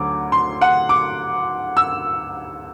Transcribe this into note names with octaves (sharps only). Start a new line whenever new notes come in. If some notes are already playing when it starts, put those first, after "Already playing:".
Already playing: D2 D3 F#3 D6
C6
F#5
D6
E6